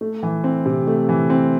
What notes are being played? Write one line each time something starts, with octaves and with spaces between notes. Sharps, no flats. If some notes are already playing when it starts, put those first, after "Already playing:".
A3
E3
C4
C3
A3
E3
C4